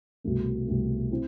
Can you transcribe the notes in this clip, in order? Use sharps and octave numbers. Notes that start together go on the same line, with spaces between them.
C2 B2 A3
C2 B2 A3
C4 E4